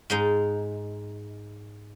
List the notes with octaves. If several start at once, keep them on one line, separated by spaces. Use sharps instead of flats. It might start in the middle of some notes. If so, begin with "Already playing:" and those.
G#2 G#3 D#4